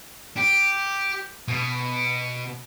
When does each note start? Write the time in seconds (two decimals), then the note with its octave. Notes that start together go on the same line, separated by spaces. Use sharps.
0.38 G4
1.48 B2